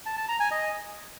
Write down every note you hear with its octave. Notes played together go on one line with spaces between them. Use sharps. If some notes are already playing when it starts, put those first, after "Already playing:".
A5
A5
A#5
G#5
D#5